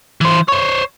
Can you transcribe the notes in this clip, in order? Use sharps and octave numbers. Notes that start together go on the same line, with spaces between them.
E3 C5
C5 C#5